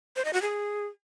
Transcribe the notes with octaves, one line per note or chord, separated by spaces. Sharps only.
C5
D#5
F#4
G#4